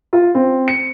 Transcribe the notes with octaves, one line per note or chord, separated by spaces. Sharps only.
F4
C4
C#7